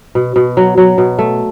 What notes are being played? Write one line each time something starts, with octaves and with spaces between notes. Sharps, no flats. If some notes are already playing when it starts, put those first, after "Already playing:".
B2
B2
F#3
F#3
B2
A3